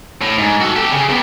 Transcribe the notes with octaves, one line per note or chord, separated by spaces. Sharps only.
A2
G#2
F#4 A4
G4 A4
C#3
C3 B3